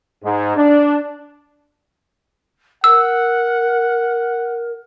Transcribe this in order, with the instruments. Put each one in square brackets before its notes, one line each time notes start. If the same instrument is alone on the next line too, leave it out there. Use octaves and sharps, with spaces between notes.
[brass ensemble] G#2
D4
[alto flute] A#4 [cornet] F#5 [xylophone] E6